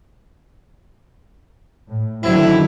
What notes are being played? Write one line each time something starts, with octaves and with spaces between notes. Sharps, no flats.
A2
F#2 D3 D#3 F#3 C4 E4